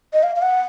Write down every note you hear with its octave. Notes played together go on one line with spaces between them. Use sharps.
D#5
F5
F5
F#5